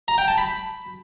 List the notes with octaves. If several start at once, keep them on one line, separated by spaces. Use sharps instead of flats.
A#5
G5
A5
B5